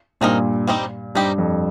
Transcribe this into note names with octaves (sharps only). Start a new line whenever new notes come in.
G2 A#2 C4 D#4 A#4 D#5
G3 C4 D#4 G4
G2 G3 C4 D#4 G4
F2